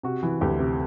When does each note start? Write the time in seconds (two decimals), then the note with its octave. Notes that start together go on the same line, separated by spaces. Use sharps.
0.03 C3 F#4
0.23 E3
0.41 D2 G4
0.59 C3